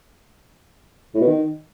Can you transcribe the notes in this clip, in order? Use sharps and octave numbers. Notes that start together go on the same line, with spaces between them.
A2
B2
D#3